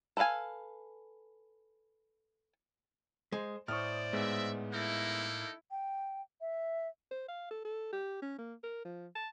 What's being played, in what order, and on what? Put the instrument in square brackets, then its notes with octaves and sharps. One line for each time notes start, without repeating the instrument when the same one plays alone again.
[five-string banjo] A4 B4 E5 F5 G#5
[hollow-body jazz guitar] G#3 [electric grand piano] C5
[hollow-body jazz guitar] A2 [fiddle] C5 D5 [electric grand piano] C#6 D#6 F6
[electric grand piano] G#2 G#3 B3 [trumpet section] D#5 E5
[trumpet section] A#3 D#4 A4 [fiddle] E4
[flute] G5
E5
[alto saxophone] C5
F5
A4
A4
G4
C#4
A#3
A#4
F3
A5